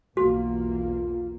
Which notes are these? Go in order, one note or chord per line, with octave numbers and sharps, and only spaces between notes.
B1 E2 A#3 F4 F#4